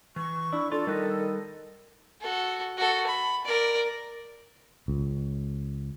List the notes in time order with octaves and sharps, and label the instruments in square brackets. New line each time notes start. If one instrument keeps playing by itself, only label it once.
[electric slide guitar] E3 [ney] C#6
[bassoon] D4 [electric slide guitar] E4
[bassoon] D4 [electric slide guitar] F4 [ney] A4
[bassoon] D#3 [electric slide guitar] G3 B4 D#5
[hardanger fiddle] F#4 A4
F#4 A4
B5
A#4 D5
[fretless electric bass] C#2